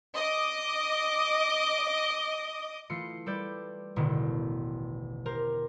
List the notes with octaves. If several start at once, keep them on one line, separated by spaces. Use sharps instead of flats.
D#5 D6
E3 A3 F4 C7 C#7
G3 A4 B4 D5 G6 D7
E1 A1 B2 D3 D#3
G4 A#4 C5 A#5